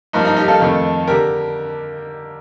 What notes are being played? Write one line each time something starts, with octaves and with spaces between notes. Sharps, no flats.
G2 F3 A#3 D#4
D#4
D#4 G4
F4 A4
F2 D#3 A3
D3 G4 A#4